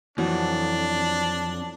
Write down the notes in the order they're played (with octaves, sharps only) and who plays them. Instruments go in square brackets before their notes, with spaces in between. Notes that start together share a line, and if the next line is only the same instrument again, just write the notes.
[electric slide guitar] F2 [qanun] E3 F#3 [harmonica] D4